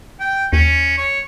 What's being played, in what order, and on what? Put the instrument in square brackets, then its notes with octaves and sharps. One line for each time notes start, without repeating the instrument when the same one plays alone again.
[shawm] G5
[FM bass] D#2 [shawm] C#4
[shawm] C#5